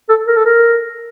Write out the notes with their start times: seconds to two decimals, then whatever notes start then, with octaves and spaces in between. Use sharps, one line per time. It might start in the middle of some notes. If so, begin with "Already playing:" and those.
0.09 A4
0.27 A#4
0.36 A4
0.45 A#4